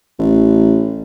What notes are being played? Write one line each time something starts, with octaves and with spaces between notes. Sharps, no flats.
A1